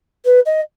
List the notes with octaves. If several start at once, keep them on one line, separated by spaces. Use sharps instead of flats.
B4
D#5